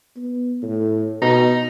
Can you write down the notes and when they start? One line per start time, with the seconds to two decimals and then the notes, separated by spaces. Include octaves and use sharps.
0.17 B3
0.62 A2
1.22 B2 D#4